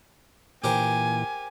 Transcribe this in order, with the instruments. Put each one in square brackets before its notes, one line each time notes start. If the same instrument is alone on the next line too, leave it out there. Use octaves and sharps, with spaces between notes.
[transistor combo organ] A#2 E3 [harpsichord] G4 A#4 C5 [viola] G#5